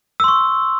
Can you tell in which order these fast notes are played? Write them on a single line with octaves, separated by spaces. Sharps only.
E6 C6 C#6